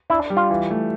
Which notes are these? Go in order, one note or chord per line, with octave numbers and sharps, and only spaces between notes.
D4 E4
G3
F4
E3
A3